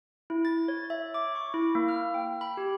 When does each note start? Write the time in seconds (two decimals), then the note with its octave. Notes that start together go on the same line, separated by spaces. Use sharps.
0.30 E4
0.45 A6
0.68 C#5
0.90 E5
1.14 D6
1.35 C#6
1.54 E4
1.75 A#3
1.88 F6
2.14 G5
2.41 B5
2.57 G4